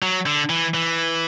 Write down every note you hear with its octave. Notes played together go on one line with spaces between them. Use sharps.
F#3
D3
E3
E3